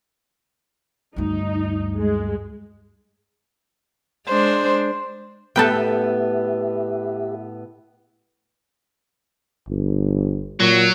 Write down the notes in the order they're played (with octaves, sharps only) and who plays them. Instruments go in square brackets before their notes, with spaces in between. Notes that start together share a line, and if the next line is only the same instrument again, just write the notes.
[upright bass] D2 G2 [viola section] D#4
[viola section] G#3
[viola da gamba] G#3 D4 [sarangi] C5
[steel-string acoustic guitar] A2 B3 [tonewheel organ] G4 E5 [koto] A4 B4 G5
[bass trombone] G1
[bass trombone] A#2 [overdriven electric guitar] F#3